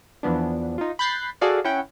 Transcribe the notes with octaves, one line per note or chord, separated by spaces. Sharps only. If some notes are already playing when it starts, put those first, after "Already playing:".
E2 E3 F3 B3 D4
D#4 F4
B5 F#6 G6 A6 B6 C7
F#4 G#4 A4 D5 F5
C#4 E4 F#5 G5